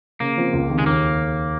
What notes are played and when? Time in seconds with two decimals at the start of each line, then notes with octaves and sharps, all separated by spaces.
0.20 C#3 A#3
0.37 F3 C4
0.53 C#2
0.70 C3 D#3
0.79 G#3
0.86 D#2 A#3